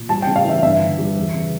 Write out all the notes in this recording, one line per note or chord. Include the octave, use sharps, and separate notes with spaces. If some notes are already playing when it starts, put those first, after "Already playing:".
Already playing: A#2
G3 A5
C#3 G5
F5
E3 E5
G2 E5
D3
G3
E2
C#3